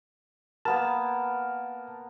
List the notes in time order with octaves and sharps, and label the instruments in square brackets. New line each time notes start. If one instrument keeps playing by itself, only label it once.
[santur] A#3 B3 A#4 [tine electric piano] A5